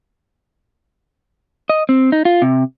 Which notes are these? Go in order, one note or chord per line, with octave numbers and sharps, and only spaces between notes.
D#5
C4
D#4
F4
C3